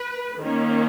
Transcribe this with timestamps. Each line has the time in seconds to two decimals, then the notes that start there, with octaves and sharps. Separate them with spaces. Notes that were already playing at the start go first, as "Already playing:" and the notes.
Already playing: B4
0.38 D#3 A#3 C#4